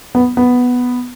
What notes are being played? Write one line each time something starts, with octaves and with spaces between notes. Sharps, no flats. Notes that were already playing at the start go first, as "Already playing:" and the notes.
B3
B3